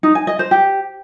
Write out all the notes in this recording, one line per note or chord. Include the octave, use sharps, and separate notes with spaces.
D#4
G#5
D#5
C5
G4